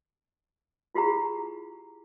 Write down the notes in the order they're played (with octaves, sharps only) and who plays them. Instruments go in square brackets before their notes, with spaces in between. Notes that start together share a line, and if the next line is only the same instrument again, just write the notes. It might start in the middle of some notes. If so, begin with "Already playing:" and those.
[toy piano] E4 F4 G4 G#4 A#5